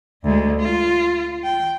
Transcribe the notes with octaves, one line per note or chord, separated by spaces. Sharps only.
D2 G#3
F4
G5